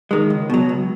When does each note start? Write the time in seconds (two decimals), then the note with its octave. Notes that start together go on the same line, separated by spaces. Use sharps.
0.11 D#3 G#3
0.30 C#2
0.50 B2 F#3
0.69 C#2